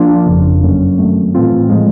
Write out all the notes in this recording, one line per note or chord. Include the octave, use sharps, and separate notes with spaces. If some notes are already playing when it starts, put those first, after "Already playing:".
Already playing: F3 A#3 D4 F4
G1 F2 C#3
F#2 D3 F#3 A#3 C#4
G2 D#3 F#3 A3 C4
A2 E3 A3 C4 F4
A2 F3 G#3